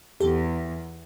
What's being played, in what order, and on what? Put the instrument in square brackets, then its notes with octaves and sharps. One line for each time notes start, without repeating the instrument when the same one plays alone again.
[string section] E2 [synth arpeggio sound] G4 A4